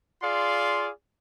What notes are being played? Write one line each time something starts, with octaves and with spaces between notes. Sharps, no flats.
F4 G#4 D5 F5 C6